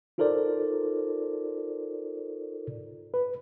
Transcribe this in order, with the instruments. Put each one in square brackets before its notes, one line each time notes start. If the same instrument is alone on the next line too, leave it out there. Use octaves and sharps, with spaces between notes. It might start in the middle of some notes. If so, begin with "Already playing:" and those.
[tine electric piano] D#4 F4 A4 A#4 C5 D5
[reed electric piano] B4